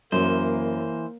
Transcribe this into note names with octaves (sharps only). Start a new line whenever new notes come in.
F#2 E3 A#3 C5